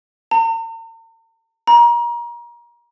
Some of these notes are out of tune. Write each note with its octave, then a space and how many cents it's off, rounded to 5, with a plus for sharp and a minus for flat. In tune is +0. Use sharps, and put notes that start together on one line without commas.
A#5 -45
A#5 +30